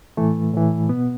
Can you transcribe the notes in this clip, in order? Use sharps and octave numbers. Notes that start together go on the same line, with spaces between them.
A2 E3 A3
A2 E3
B2 B3